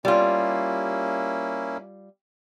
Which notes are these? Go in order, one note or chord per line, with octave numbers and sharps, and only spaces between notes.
G3 A#3 C#4 E4 F4